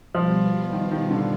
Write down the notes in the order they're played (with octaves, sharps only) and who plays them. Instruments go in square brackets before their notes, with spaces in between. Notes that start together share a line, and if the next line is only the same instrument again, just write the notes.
[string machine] B2 G3 B3 F4 [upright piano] F3
[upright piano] D#3
D#3
D3